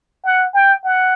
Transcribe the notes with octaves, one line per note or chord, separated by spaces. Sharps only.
F#5
G5
F#5